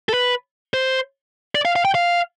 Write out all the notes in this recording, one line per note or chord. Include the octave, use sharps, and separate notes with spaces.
A4
B4
C5
D5
F5
F5
G5
F5